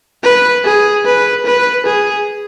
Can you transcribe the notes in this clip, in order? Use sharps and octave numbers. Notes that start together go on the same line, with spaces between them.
B4
G#4
B4
B4
G#4